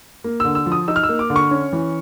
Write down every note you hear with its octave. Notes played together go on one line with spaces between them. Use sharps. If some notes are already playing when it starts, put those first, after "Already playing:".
A#3
D3 E6
E6
F3
D#6
D#4 E6
F6
E6
A#3
D6
D3
C#6
C#4
E3